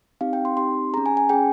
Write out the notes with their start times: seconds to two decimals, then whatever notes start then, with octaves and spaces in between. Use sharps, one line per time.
0.21 C4 D#4 G4 F5
0.33 G5
0.45 C6
0.57 C4 D#4 G4 C6
0.94 C#4 G#4 A#5
1.06 G#5
1.17 G#5
1.29 C#4 G#4 G5